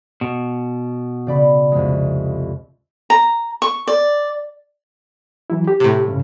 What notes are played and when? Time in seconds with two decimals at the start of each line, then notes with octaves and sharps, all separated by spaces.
0.21 B2
1.27 C#3 D5 B5
1.72 C2 F2 G#3
3.10 A#5
3.62 C#6
3.87 D5
5.50 E3 F#3 E4
5.68 G4
5.80 A2 C3
6.08 G2 C#3 C#4